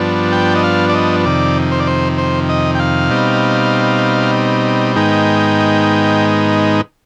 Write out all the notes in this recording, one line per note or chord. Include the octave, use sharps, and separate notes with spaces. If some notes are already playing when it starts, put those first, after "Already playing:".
Already playing: G2 F3 B3 D4
G5
D#5
F5
D5
D#5
F2 C3 D#3 D5
C5
D5
C5
C5
D#5
G5
F5
B2 G3 C4 D#4
G#2 D#3 G#3 B3 D#4 G5